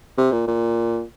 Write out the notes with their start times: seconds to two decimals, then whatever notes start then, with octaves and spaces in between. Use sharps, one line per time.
0.18 C3
0.32 A#2
0.47 A#2